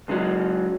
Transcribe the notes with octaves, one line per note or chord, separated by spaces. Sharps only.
C#2 C#3 F#3